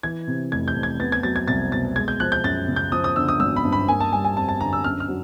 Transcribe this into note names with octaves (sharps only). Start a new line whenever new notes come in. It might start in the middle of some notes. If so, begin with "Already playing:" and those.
E3 G#6
C3
F1 G#6
G6
F2
G#6
B3 A6
G#6
F#3 A6
G#6
C2 A6
B2 A6
G#3 G#6
G6
F3 F#6
G6
F#2 A6
C#3
G6
F3 D#6
D#6
D3 E6
D#6
G#1 E6
B5
G2
B5
A#3 G#5
A5
G3 G#5
G#5
F2 A5
A5
D3 A#5
E6
F#2 F6
F6
F#3